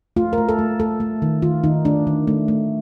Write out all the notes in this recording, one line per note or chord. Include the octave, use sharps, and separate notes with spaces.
A3 F4
A#4
A3
A4
A3
A3 A4
A3
D#3
D#3 F4
D#3 D#4
A3 D4
D#3
A3
A3